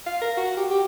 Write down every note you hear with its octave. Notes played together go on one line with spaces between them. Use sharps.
F5
A#4
F#4
G4
G4